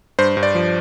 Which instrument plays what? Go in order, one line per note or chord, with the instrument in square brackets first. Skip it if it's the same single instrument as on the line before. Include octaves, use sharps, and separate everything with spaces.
[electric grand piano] G2 C5
G2
D5
F3